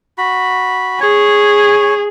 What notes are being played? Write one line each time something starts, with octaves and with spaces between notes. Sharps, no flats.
F#4 B5
G#4 C#5